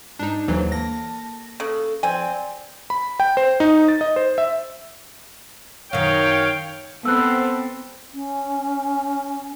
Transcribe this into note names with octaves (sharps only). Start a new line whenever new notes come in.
G#2 D4 D#4
D#2 D3 E3 F#3 A3 D4 C5
A#3 A5 A#6
C#3 A4
F3 C4 D5 G#5
B5
G5
C5
D#4
A6
D#5
C5
E5
F#2 D#3 C#5 F5 G5
B3 C4 A4 E6 F#6
C#4